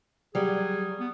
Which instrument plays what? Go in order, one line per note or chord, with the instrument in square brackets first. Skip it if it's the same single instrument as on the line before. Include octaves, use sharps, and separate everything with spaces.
[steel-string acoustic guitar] F#3 G3 [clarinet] G#4
[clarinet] B3